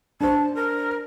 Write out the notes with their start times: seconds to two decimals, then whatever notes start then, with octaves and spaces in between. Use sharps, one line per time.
0.21 D4 C5 A5
0.54 A#4